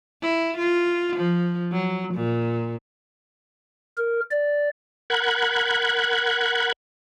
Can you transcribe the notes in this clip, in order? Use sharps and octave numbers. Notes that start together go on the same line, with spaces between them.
E4
F4
F3
F#3
A#2
A#4
D5
A#4 F#5 B5 F#6 G#6